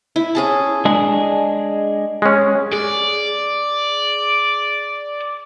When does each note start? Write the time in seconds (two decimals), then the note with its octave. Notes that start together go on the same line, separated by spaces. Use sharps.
0.16 E4
0.35 C#4 G#4 A5
0.85 G#3 D4 G#4
2.22 G#3 C#4
2.72 G#4 D5